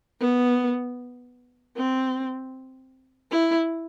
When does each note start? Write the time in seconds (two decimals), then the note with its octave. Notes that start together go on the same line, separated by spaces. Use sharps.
0.20 B3
1.77 C4
3.31 E4